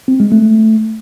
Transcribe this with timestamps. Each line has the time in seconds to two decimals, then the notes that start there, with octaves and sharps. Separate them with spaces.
0.08 C4
0.20 G#3
0.32 A3